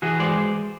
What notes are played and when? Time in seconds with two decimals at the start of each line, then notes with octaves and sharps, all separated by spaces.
0.02 E3 F#4 G#4
0.19 G#3 C5 D5